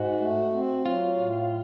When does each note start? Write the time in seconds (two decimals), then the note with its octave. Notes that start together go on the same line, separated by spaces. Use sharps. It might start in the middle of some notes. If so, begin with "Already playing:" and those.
Already playing: G#2 F#4
0.20 A3
0.53 C4
0.85 F#3 F4
1.17 A2